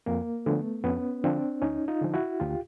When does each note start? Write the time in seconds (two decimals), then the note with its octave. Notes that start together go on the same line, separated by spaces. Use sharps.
0.06 F2 A#3
0.46 D3 F3 A3 B3
0.84 F2 B3 C#4
1.24 D3 F3 C4 D4
1.62 D2 C#4 D#4
1.88 D#4 F4
2.01 D3 F3
2.14 E4 F#4
2.40 D2 F4 G4